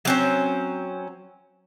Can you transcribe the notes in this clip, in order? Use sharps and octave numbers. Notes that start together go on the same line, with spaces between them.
F#3 C4 C#4